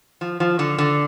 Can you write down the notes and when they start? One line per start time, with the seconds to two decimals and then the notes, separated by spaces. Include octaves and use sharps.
0.21 F3
0.40 F3
0.59 D3
0.78 D3